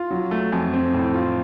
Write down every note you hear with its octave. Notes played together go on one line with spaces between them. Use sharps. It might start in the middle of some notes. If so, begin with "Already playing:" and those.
Already playing: F4
F#3
A3
F2
C4
A2
F4